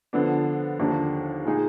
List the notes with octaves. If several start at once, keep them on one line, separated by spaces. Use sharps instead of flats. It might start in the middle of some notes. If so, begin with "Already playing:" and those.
D3 F3 B3 D4
D#2 D3 F3 A#3 D4
A#2 G#3 D#4 G#4